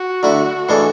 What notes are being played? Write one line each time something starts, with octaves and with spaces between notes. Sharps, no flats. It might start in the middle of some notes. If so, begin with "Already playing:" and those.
Already playing: F#4
D3 A3 E4
A2 E3 G#3 D4 A4